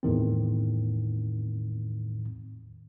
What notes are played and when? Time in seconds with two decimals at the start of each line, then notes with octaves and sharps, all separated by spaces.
0.03 E2 A2 D#3 C4